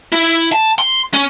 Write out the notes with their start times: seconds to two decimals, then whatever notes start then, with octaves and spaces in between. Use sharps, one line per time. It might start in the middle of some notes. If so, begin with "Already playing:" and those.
0.12 E4
0.52 A5
0.79 C6
1.14 C#4